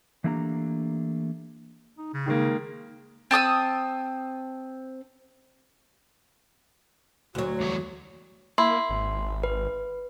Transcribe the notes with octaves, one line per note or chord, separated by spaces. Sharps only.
E3 A3 A#3 D4 G4 A#5
D#4
C#3
D#3 G#3 A#3
C4 A5 D#6 E6
D2 F#3 F#4
E2 G3 C#5
A#3 E4 C6
G#1
B4